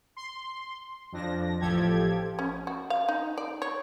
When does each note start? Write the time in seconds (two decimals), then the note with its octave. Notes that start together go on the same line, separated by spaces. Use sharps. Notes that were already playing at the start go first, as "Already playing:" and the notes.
0.16 C6
1.12 F2 F3 D4 A#6
1.60 A1 F3 G4 A4 G#6
2.39 C#4
2.67 F#4
2.90 F5
3.08 D#4
3.38 D5
3.62 C#5